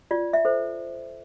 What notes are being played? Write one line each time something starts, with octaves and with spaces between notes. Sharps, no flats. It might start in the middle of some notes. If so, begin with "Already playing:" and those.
F4 D5
E5
A4 C5